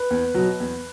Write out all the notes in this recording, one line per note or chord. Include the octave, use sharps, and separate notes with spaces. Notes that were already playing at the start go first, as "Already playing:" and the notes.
Already playing: B4
E2
B2 F#3
E2